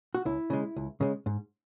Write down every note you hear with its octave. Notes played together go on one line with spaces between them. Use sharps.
F#4
C#2 E4
C#3 G#3
C#2
C#3 G#3
G#2